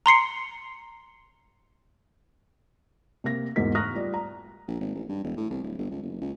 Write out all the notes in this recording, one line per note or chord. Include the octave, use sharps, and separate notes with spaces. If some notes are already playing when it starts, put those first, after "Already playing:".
A#5 C6 C7 C#7
C3 A#3 A#6
E2 G#2 F#4 A#4 B6
A#5 C#6 D#6 F6 F#6 A#6
G3 F4 D5
A#5
A#1
G#1
A1
G2
E1
A2
C2
D1
G1
C#2
F#1
C#2